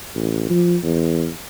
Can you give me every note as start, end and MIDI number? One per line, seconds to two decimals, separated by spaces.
0.16 0.48 33
0.50 0.77 53
0.83 1.29 40